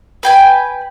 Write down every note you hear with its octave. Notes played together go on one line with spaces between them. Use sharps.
B4 G5 G#5